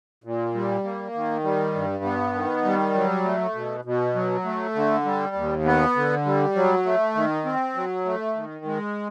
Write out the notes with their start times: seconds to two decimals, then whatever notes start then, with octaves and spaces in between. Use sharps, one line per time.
0.24 A#2
0.54 G3
0.84 A#3
1.14 D#3
1.44 G3
1.74 G2
2.04 B3
2.35 D#3
2.65 G3
2.95 F#3
3.24 A3
3.55 B2
3.85 B2
4.15 F#3
4.45 A3
4.75 D3
5.05 G3
5.35 D#2
5.65 B3
5.96 D3
6.25 G3
6.56 F#3
6.85 A3
7.15 D#3
7.45 C4
7.76 F#3
8.05 A3
8.36 D#3
8.65 G#3